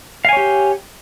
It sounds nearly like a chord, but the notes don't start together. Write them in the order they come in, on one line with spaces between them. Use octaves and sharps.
F5 G#5 C#5 G4